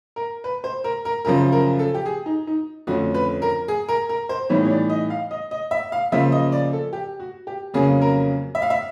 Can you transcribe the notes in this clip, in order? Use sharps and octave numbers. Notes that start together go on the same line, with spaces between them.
A#4
B4
C5
A#4
A#4
F#2 C#3 F3 A#4
A#4
A4
G4
G#4
D#4
D#4
F2 D3 F3 A3 C#4 F#4
B4
A#4
G#4
A#4
A#4
C5
A2 E3 G3 B3 D#4 C#5
C#5
D5
D#5
F5
D#5
D#5
E5
F5
C#3 F3 A#3 E5
D#5
D5
A4
G4
F#4
G4
F2 C#3 F#3 A#3 C#4 G#4
A#4
E5
F5
E5